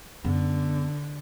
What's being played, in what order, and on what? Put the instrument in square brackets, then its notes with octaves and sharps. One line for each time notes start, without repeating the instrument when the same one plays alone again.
[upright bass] F#2 B3 [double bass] D3